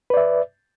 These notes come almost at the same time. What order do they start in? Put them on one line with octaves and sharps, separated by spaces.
B4 D5 E5